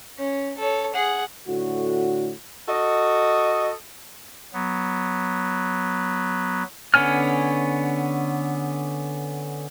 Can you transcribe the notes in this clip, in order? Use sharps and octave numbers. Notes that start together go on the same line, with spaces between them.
C#4
A4 C#5
G#4 F#5
A2 D3 F#4
F#4 A4 D#5
F#3 B3
D3 B3 C#4 G#5 F6